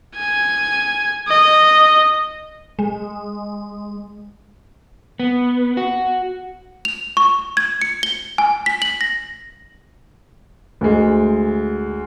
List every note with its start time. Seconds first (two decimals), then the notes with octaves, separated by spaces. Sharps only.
0.17 G#5
1.28 D#5
2.79 G#3
5.20 B3
5.77 F#4
6.85 F7
7.17 C#6
7.57 G#6
7.81 C#7
8.03 G7
8.38 G#5
8.66 B6
8.82 F#7
9.01 A#6
10.81 D2 G#3